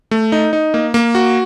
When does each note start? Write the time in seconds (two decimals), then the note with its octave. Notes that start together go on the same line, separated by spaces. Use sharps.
0.11 A3
0.32 D#4
0.53 D#4
0.74 A#3
0.94 A#3
1.15 F#4